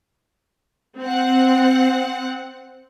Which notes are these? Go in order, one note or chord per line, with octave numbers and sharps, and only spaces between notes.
C4 F#5